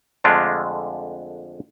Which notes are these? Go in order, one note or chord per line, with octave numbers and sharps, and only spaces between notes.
F2 D3 G#3 A3 D4 F4